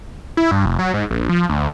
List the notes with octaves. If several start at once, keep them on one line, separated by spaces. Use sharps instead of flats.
E4
G2
F1
F#3
G#2
A#1
F3
D2